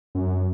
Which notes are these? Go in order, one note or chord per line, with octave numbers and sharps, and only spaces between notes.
F#2